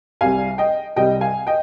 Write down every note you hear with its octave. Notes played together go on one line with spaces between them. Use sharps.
C2 C3 G3 F5 G#5
D#5 G5
C2 C3 G3 D#5 G5
F5 G#5
D#5 G5